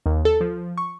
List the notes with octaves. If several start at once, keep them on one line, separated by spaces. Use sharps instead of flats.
D#2
A4
F3
C#6